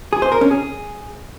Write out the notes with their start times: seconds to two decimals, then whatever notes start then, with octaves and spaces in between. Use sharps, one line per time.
0.13 G#4
0.22 C5
0.32 A#4
0.41 C#4
0.51 G#4